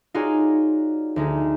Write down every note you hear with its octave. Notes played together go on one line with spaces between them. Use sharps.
D#4 F4 F#4 G#4 C#5 D5
D2 D#4 G#4